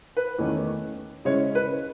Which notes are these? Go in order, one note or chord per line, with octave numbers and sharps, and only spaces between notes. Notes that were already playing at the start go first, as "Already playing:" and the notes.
B4
E2 D#3 A3 C#4
C#3 G#3 C#4 E4 C#5
B4